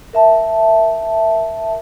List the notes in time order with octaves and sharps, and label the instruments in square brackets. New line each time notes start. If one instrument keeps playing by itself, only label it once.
[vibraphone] A#4 E5 A5